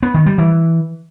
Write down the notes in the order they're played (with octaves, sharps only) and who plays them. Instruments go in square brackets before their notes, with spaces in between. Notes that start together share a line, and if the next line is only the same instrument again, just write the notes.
[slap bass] B3
D#3
G3
E3